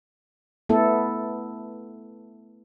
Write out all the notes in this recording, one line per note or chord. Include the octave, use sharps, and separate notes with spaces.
A3 B3 E4 A4